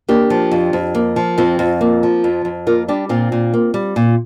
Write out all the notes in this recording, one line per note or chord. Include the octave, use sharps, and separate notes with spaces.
A#3 D4 G4
F3
F2
F2
A#3
F3
F2 C4 F4
F2
A#3
F3
F2
F2
A#3 F4 A#4
G3 D4 G4
A#2 C4 F4
A#2
A#3
G3
A#2